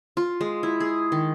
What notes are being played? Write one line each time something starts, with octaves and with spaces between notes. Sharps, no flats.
F4
G#3
E4
G#4
D#3